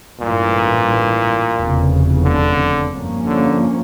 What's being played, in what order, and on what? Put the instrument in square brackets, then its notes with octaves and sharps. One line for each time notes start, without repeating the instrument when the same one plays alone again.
[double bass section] A1 G2 E3 [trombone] A#2
[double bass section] F1 E2 C#3
[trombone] D3
[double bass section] G2 F3 A#3 C#4
[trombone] D3